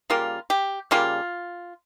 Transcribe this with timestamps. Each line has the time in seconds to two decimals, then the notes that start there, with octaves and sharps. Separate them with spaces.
0.10 C#3 G3 A#3 F4
0.50 G4
0.91 C#3 G3 A#3 F4